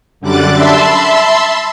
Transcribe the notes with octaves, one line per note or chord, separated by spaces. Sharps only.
F#2 D3 G3 D6 F#6 A6
E5 A5 B5 C6 E6